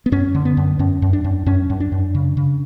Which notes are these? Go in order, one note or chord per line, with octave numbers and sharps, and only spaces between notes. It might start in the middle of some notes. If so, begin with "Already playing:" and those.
B3
F#2 C#4
D3
B3
F#2
F#2 C#4
F#2
D4
F#2
F#2 C#4
F#2
D4
F#2
C#3
C#3